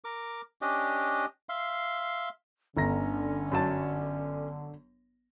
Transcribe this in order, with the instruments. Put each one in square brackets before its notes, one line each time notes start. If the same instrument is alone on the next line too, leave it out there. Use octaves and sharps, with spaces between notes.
[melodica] A#4 D6
C#4 D4 G4 D#5
E5 F5 C6
[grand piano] G1 A#5 A#6 [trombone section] D3 [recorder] C#4
[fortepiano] F#2 F#3 A5